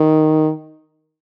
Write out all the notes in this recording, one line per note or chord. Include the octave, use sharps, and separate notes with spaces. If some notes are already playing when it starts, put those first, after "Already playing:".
Already playing: D#3